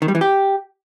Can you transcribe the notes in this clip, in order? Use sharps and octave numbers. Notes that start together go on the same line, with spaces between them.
D#3
G3
E3
G4